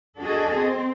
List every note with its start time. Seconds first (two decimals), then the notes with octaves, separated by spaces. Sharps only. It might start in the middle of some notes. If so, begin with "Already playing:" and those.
0.19 D4 F#4 G#4 A4 D#5
0.56 C4